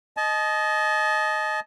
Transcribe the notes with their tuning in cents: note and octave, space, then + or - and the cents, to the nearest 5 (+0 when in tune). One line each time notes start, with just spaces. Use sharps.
D#5 +0 A5 -35